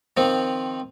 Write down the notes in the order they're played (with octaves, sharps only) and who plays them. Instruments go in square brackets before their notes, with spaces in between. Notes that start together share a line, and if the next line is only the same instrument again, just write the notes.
[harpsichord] D#3 F3 C4